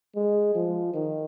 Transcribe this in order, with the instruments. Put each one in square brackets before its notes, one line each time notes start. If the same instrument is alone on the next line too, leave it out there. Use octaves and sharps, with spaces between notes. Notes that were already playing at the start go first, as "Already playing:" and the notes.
[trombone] G#3
F3
D#3